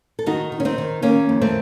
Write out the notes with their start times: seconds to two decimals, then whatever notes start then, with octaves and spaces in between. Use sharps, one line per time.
0.19 A4
0.26 D#3 D#4 F#4
0.52 D#3
0.60 C#4
0.65 C4 D#4
0.78 D#3
1.02 D#3 A#3 C#4
1.29 F2
1.41 A3 C4